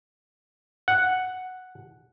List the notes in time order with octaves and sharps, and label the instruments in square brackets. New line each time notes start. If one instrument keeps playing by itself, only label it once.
[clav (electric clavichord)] F#5